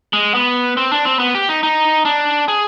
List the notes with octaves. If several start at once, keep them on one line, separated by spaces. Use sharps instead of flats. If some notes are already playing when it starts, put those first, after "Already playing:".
G#3
B3
C4
D4
C4
B3
G4
D#4
D#4
D4
G#4